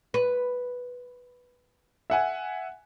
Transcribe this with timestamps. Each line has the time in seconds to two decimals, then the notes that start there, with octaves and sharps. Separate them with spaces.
0.14 B4
2.10 E5 F#5 G#5